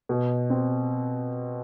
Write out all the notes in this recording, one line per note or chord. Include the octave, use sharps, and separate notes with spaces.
B2
C4